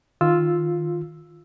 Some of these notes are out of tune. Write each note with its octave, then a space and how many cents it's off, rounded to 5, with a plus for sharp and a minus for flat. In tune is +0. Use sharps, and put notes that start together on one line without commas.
D#3 +0 F4 +0 E6 +0